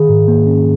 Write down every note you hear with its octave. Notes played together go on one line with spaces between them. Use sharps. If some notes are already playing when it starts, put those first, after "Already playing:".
Already playing: D#3 G#4
G#2
A#3
C#4